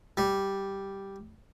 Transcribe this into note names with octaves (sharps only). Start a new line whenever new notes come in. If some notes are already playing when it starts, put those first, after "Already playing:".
G3